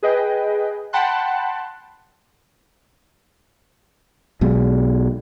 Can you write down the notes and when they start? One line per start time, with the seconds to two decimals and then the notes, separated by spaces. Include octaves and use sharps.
0.03 G#4 B4 D#5 G5
0.93 F#5 G5 A5 B5 C6 F#6
4.41 B1 B2 G#3